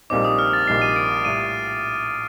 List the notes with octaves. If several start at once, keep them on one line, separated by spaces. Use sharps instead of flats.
A#1 A#2 G3 C4 D#4 D6
D#6
F6
A6
A#1 A#2 G3 C4 D#4 C7
D#7
D7
A2 G3 D#7